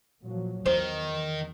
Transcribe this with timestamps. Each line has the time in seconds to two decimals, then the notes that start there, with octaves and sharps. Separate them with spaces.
0.24 A#2 F3 F#3
0.66 E2 D#3 C5